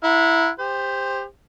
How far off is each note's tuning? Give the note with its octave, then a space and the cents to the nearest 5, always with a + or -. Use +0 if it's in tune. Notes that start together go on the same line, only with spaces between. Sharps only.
E4 +5 F#5 -30 A#5 +0
G4 +25 C5 +0